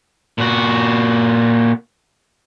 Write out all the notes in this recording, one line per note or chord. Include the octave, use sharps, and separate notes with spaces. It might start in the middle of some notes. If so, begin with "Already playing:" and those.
A#2 F#4